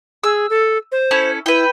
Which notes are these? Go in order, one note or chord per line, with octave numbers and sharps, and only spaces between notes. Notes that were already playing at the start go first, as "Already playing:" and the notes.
G#4 E6
A4
C5
C#4 E4 A4
E4 B4 G5